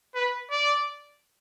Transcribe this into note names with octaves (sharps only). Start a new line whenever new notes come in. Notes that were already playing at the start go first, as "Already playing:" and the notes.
B4
D5